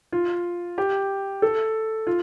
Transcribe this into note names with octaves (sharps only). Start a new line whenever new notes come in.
F4
G4
A4
F4